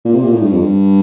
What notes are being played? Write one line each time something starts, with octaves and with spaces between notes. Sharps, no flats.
A#2
C3
A#2
A2
G2
F2
G2